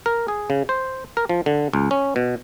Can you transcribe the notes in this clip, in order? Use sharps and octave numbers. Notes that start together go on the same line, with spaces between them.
A#4
G#4
C#3
C5
A#4
F3
D3
C#2
C#4
B2